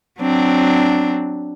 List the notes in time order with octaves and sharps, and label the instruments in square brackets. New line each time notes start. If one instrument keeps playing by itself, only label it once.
[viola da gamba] F#3 C4 D4